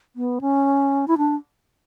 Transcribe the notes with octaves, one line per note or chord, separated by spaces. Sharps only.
B3
C#4
E4
D4